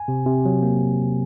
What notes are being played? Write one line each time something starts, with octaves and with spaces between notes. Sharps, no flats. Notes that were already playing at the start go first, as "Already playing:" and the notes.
Already playing: G#5
C3
C3
F#3
A#3